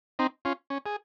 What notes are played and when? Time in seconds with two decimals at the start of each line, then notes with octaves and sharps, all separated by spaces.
0.19 C4 D#4
0.45 C#4 F4
0.70 C#4
0.86 G#4